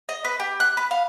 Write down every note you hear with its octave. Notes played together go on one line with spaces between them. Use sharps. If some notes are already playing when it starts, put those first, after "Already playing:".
D#5
B4
G4
F#6
B4
F5